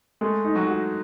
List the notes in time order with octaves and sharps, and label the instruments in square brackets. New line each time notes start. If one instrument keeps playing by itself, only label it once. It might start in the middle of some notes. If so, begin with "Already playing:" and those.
[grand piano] G#3 [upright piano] A3 A4
[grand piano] D#4
[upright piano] F#3 F#4
[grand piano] F#4